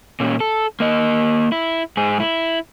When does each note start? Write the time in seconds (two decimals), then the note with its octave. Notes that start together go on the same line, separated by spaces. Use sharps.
0.20 A#2 C#4
0.40 A4
0.80 A#3 D#5
1.52 E4
1.97 G#2 G#4
2.20 E4